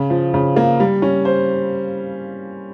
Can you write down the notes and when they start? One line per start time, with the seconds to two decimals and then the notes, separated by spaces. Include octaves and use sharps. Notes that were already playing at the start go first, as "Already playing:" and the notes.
Already playing: C#3
0.10 F3
0.34 C#3
0.56 A#3
0.80 G3
1.02 C#4
1.25 C5